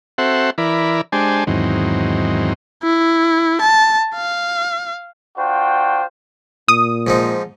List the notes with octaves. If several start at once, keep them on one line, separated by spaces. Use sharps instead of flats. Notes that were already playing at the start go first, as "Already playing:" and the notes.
C4 F#4 A4 C5 E5 F#5
E3 E4 A#4 D5 B5
G#3 D4 G4 C5 G#5 A5
E2 G#2 D#3 F#3 C4
E4
A5
F5
D4 F4 F#4 C5 G5
A#2 D#6
G#2 F3 D#4